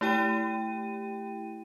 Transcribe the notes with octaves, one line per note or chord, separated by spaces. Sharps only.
A3 E4 G4 G5 D#7